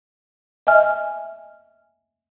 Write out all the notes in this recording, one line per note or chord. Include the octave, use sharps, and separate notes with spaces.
D#5 E5 G#5 F6